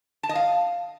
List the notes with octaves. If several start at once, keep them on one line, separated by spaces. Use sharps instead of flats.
A5
D#5
F5